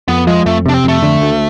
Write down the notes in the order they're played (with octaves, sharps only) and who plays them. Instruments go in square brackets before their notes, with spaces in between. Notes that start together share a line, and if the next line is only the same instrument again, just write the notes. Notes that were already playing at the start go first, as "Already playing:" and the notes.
[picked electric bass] F2 [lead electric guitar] B3
[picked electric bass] F3 [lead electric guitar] G#3
[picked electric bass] F2 [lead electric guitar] A3
[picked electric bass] C3 [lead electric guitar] D4
[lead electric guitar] C4
[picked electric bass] F2 [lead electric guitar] A3
[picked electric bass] D3
D2